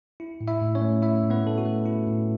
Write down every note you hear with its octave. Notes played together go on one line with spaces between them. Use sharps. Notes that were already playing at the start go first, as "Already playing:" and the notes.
E4
A2
E4 E5
A2
C#4 C#5
A3
E4 E5
A2
B3 B4
A2 A4
F#4
A3
E4
A2